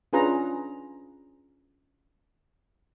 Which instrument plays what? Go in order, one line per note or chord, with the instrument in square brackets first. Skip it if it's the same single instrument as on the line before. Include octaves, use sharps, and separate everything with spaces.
[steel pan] C#4 D4 F4 G#4 B4 A#5